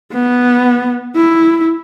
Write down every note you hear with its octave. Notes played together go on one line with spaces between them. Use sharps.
B3
E4